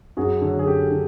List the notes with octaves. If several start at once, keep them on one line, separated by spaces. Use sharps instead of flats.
F#2 F#4 G#4
D3 F#3
G#4
F#2 G4 A4
D3